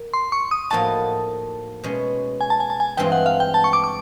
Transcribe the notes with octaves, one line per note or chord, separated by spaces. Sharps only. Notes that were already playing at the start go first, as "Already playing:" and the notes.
Already playing: A#4
C6
C#6
D#6
A2 F3 A#3 D#4 F#4 A5
B2 G#3 C#4
G#5
A5
G#5
A5
G#5
G2 E3 G#3 C4 F4 G5
F#5
F5
G5
A5
C#6
D6
D6